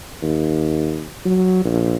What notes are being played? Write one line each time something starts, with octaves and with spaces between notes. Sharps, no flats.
D#2
F#3
A#1